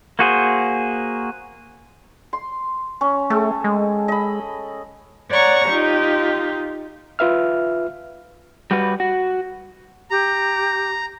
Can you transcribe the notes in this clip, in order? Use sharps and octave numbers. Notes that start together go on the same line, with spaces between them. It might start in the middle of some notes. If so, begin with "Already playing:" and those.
A#3 F#4 G#4 C5
C6
C#4
A3 G#4 A4 G5
G#3
D#5 B5
C#5 D5 F#5 A#5 C#6
D#4 F4 G4
F4 B4 E5 F6
G3 F#4 B4
F#4
G4 A#5